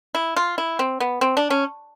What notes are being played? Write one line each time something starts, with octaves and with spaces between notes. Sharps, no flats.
E4
F4
E4
C4
B3
C4
D4
C#4